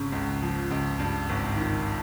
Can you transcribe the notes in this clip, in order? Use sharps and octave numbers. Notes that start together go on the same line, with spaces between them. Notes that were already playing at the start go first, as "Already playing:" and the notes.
Already playing: G#1 C#3
C#2
F3
C#2
G2
G#1
D#3